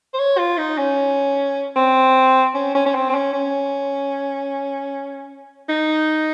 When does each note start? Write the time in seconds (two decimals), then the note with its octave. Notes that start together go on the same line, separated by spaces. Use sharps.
0.14 C5
0.19 C#5
0.38 F4
0.58 D#4
0.78 C#4
1.76 C4
2.55 C#4
2.75 C#4
2.86 C#4
2.95 C4
3.10 C4
3.15 C#4
3.33 C#4
5.69 D#4